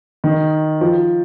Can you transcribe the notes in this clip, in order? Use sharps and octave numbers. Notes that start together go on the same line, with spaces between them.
D#3
F3